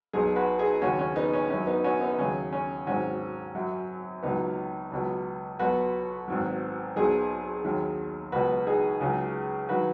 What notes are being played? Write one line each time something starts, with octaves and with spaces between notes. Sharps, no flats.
B1 B2 F#3 D#4 G#4
F#4 B4
D#4 G#4
D#2 C#3 F#3 C#4 F#4
C#4
B3 D#4
C#4
F#2 F#3 C#4
B3 D#4
C#4 F#4
B3 D#4
D#2 C#3 F#3 C#4
C#4
G#1 G#2 D#3 F#3 C#4 F#4
F#2 F#3
C#2 B2 F#3 B3 D#4
C#2 B2 F#3
B1 B2 F#3 F#4 B4
G#1 G#2 F#3
B1 B2 F#3 D#4 G#4
D#2 D#3 F#3
C#2 B2 F#3 F#4 B4
D#4 G#4
C#2 C#3 F#3
D#3 F#3 F#4 B4